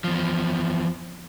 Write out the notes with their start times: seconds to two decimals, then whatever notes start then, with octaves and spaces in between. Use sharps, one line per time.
0.04 E2 F3